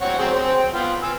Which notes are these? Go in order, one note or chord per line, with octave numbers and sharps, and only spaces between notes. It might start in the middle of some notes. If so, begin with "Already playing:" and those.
C4 C#5 F#5
F#3 C4 G#4
C4
G5
B3 F4
G#5 E6